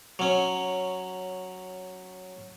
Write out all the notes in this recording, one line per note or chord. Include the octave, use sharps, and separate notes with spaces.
F#3 C#4